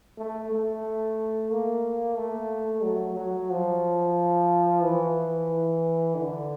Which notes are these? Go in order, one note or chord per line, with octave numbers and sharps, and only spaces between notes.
A3
A3
A#3
A3
F#3
F#3
F3
E3
D3